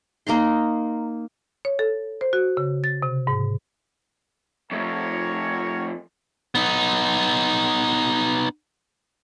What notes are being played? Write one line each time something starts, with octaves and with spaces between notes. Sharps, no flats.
A#3 D#4 A#5 C6
C#5
A4
C5
F#4
C#3
A6
C3
G#2
F2 A3 A#4 C#5
B3 D#4